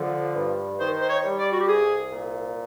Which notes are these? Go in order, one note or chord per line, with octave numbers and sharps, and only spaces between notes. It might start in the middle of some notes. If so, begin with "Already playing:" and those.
Already playing: D3 F3
G2
D#3 C5
C5
C#5
G3
D5
F#4
G4
C2 G#4
A#2